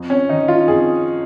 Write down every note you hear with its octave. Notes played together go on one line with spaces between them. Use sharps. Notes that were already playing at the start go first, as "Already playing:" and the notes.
Already playing: F2
C#4
D#3 D#4
F4
F2 G#4